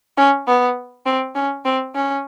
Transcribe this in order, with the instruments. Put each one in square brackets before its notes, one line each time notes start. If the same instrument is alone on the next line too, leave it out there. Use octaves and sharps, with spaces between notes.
[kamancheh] C#4
B3
C4
C#4
C4
C#4